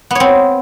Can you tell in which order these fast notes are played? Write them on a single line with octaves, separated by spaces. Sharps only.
B3 C#5 C4